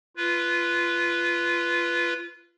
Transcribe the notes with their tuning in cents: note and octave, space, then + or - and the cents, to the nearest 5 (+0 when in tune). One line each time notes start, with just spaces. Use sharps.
F4 -20 B4 +0